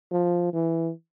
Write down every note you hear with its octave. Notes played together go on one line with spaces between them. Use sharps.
F3
E3